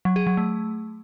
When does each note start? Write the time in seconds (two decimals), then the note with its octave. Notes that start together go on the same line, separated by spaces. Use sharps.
0.05 F#3
0.16 G#4
0.27 F#3
0.37 A3